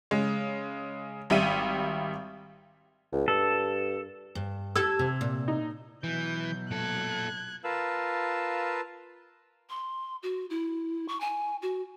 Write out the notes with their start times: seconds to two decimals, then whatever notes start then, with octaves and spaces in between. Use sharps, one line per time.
0.11 C#3 G#3
1.30 G#1 G3 E5 D#7
3.12 C#2
3.28 G2 A4
4.35 G2
4.76 G4 A4 E6 G#6
4.99 C3
5.21 A#2
5.48 D#4
6.04 B2 E3 F#3 G6
6.71 A#2 A4 F#6 G#6
7.64 F4 A#4 B4 F5 A5 E6
9.70 C6
10.23 F#4
10.50 E4
11.09 C#6
11.20 G#5
11.62 F#4